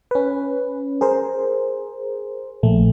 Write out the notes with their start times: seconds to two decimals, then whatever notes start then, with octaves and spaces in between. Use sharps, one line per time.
0.11 C#4 B4
1.01 G#4 A#4 C5
2.63 A#1 A3